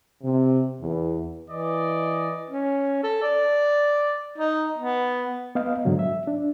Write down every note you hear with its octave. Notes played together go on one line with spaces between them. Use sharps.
C3
E2
E3 D5 D#5
C#4
A4
D5
D#4
B3
B3 D#5 F5
G#2 D3 D#3 F#3
E5
D4